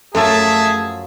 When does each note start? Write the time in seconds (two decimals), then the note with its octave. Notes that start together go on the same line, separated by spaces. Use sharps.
0.15 F#2 F3 F#3 A3 G#4 E5 A5